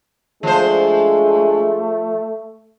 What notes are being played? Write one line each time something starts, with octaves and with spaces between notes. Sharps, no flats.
F3 G#3 A3 D4 G#4 C5